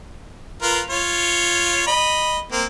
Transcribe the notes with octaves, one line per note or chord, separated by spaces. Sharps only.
F4 A#4 B4
F4 C#5
D#5 B5
A#3 C4